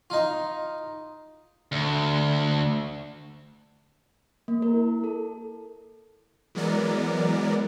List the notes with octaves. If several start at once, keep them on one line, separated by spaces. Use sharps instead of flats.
D#4 F4
D2
A#3
A#4
E4
A4
E3 F#3 G#3 B3 A#4 D5